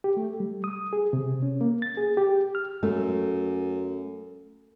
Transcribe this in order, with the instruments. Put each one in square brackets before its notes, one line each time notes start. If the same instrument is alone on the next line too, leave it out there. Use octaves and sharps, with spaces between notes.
[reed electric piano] G4
A3
G3
D#6
G#4
C3
C#4
A#3
A6
G#4
G4
F6
[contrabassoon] F#2 [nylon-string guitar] A3